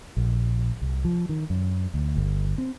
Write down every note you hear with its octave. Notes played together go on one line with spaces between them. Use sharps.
A#1
C2
F3
D#3
F#2
D2
G1
C4